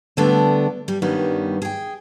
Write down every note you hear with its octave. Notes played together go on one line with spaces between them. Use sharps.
D3 G3 A3 B3 D4
G3
G2 D#3 G3 B3 C#4
G#4 G5